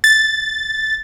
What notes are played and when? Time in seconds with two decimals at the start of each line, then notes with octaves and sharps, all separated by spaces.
0.04 A6